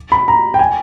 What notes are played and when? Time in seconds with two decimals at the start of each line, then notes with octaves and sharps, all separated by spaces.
0.12 B5
0.28 A#5
0.54 G5
0.59 G#5